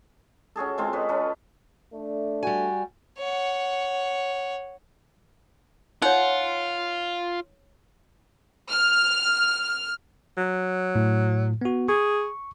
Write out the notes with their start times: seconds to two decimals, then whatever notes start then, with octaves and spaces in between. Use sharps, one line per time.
0.56 C#4 F#4 G#4 A4
0.78 G#3 C4 F4 A4
0.93 C#4 B4 D#5
1.09 C#4 A4 B4
1.93 A3 D4
2.43 G3 F#4 G#5
3.19 C#5 F#5
6.02 D#4 F4 C#5 F#5
8.70 F6
10.37 F#3
10.95 A2
11.61 B3 F#4
11.88 G#4 C#6